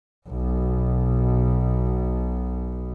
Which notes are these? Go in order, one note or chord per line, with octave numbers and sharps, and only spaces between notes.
B1 B2